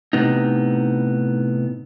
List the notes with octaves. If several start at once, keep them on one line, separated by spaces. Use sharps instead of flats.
A2 C3 B3 D#4